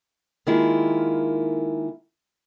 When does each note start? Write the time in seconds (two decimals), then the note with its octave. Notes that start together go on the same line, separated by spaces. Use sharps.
0.47 D#3 G#3 A#3 E4 F4